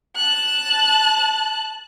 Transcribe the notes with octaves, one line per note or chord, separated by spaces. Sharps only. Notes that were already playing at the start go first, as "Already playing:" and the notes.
A5 F#6